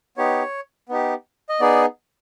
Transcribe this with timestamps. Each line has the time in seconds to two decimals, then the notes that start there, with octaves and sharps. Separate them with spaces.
0.17 B3 D#4 G4 C#5
0.89 B3 D#4 G4
1.49 D#5
1.60 B3 D#4 G#4 D5